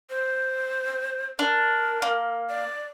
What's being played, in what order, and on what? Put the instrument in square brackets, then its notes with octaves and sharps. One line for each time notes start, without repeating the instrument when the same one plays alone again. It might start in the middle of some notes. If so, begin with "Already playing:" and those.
[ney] C5
[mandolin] D4 [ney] A#4
[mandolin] A#3
[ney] D5